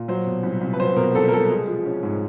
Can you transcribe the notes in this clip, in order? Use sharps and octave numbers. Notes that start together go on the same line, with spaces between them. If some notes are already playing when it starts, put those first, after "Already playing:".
Already playing: A#2
F#3 C5
B2
C2
C2
B4
F#3 C5
B2 A#4
C2 A4
A#4
C2 A4
G#3
F3
C#4
G#2